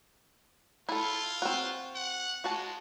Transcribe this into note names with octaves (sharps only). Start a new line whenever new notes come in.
E4 F4 A4
C4 F#4
F#5
G#3 F#4 A5